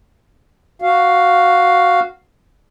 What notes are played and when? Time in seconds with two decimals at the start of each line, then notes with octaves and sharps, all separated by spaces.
0.82 F#4 F5